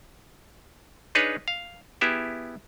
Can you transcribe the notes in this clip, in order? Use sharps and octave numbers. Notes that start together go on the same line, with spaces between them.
D4 D#4 G#4 B4 C#5
F5
B3 E4 G4 G#4 E5